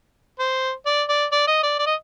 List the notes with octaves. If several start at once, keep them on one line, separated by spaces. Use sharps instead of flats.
C5
D5
D5
D5
D#5
D5
D5
D#5